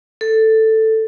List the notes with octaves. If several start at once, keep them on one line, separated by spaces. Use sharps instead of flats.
A4